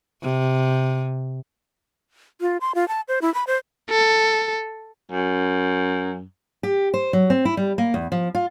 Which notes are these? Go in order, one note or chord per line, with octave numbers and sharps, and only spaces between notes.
C3
F4
C6
F4
A5
C5
E4
B5
C5
A4
F#2
G4
C5
F#3
C4
E4
G3
A#3
E2
F3
F4